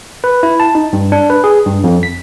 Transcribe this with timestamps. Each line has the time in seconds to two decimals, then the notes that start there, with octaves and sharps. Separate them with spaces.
0.24 B4
0.43 E4
0.60 A5
0.75 D#4
0.93 G2
1.12 D4
1.30 B4
1.44 G#4
1.66 G2
1.84 F2
2.03 B6